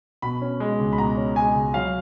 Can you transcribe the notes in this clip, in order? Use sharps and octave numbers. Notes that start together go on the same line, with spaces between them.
B2 B5
C#4
G#3
C#2
B5
B2 A#5
C#4
G#3 G#5
C#2
F#3 F5